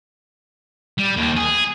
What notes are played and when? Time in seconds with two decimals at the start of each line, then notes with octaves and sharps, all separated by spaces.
0.99 G3
1.16 D#2
1.37 G#4